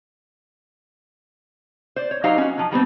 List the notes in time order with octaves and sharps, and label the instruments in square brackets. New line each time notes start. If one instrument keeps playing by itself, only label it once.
[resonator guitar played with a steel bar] C5 D5
C#5
F#3 D#4 G4 C5 F5 A#5
C#4 F#4
F3 F#3
D#3 G3 B3 C4